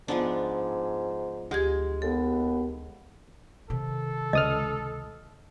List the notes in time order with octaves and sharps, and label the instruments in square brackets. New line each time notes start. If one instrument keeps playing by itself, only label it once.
[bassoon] G#2 [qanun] F3 B3 D4
[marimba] D2 G4 G#6 [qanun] G#3
[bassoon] D#2 [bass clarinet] B3 [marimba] A4
[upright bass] C3 D#3 [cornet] A4
[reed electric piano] C#2 D#6 F6 [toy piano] D#5